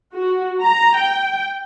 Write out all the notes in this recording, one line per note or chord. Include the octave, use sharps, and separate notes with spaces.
F#4
A#5
G5